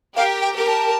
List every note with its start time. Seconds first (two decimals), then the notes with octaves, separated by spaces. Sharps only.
0.16 G4 A#4 F5
0.42 G5
0.54 G4 A#4
0.67 A5